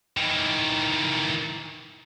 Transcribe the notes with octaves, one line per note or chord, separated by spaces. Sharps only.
D#3 E3